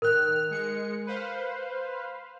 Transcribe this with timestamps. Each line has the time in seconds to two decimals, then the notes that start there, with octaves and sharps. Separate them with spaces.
0.02 D#3 A#4 F6 F#6
0.50 G#3 C#7
1.06 B4 C5 F5